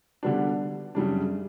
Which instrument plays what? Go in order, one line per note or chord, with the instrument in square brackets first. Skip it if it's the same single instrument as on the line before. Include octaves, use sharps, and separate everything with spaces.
[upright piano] D3 G3 B3 D4
F#2 C#3 G3 D4